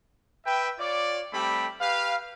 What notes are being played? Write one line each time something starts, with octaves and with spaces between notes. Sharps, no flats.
B4 E5 G5
F4 C#5 D5
G3 A3 C4 G4 B5
G4 B4 F5